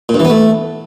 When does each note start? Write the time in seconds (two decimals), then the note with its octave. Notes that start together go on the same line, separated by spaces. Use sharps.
0.09 A#2
0.14 G2
0.20 E3
0.25 B3
0.30 A3